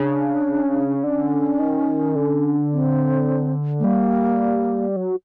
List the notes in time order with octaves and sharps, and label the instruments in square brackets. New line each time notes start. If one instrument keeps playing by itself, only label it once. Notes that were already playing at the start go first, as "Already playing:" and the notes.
Already playing: [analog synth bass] C#3 [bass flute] D4
[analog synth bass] D3 [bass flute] C#4
[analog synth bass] D#3
D3
[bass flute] C4
A3
[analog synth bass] G3 [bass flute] A#3
[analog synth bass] F#3